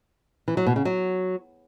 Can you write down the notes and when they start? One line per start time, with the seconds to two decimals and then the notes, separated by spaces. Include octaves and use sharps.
0.48 E3
0.57 F#3
0.67 B2
0.76 C#3
0.85 F#3